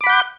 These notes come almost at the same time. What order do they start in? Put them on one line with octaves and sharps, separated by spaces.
D6 B5 F#5 G6